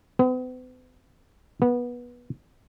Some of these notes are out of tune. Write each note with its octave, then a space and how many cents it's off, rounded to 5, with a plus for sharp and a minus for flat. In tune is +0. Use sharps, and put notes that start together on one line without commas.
B3 +45
B3 -20